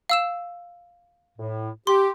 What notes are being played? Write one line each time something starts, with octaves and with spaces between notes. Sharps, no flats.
F5 E6 E7
A2
G4 C6